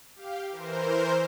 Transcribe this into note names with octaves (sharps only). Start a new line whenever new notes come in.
G4 F5
E3 A#4 C5